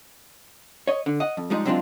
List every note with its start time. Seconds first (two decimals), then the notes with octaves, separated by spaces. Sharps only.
0.87 C#5 D#5
1.06 D3
1.20 D#5 F#5
1.37 F2
1.50 F3 G3 G#3 D#4
1.65 C3 F#3 G#3 C4 D4 F4